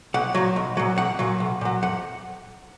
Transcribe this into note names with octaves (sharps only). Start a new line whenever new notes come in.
B1 F#5
A#2 F#3
B1
A#2 F#3
B1 F#5
A#2 F#3
B1
A#2 F#3
F2 F#5